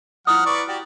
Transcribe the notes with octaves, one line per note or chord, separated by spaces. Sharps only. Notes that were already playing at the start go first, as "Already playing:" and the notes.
F3 E4 F#5 A#5 D#6 F6
B4 D5 C#6
F#4 G4 D5